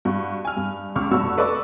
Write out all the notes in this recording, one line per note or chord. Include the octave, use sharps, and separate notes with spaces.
G2 F#4 C#6
G#5 F6
G2
C#2 C#6 D6 F6
F1 G2 B2 F#4 C#6 E6
A4 B4 D5 D#5 C#6 E6